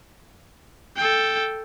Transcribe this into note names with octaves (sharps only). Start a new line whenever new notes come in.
A4 G5